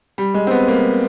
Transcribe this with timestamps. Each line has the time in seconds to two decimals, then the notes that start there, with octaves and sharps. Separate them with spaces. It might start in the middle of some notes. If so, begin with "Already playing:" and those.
0.18 G3
0.34 G#3
0.47 C4
0.51 B3
0.68 A#3